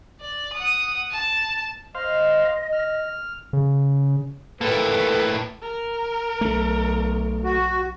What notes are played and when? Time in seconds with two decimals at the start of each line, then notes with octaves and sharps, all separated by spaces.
0.20 D5
0.53 F#5 D#6
1.11 A5
1.95 C5 D#5 F5
2.72 F6
3.53 C#3
4.61 A2 A#3 A4 B4
5.62 A#4
6.41 B1 A3
7.44 F#4